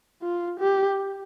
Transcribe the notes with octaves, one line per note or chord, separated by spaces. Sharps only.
F4
G4